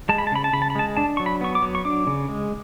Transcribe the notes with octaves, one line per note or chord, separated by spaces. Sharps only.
G#3 A5
B5
A5
C#3 B5
A5
C#3 B5
A5
B5
G#3 A5
D4 A5
F#3 C#6
B5
B3 C#6
D6
F#3
C#6
D4 D6
C#3
G#3